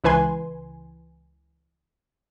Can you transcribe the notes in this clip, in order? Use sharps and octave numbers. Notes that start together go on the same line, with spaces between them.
C#2 E3 B4 G#5 C6